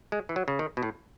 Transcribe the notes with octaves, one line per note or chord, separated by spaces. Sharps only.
G#3
E3
F#3
C#3
D#3
B2
A2